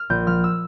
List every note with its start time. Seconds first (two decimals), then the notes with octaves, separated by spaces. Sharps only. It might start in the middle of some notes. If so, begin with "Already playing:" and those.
Already playing: F6
0.10 A#1 G6
0.27 F3 F6
0.44 E6